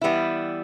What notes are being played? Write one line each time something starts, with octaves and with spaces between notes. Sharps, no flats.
E3 G3 B3 E4